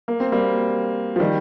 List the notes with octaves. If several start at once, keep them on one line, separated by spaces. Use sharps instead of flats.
A#3
C4
G3 A#3
F3
D#3 G3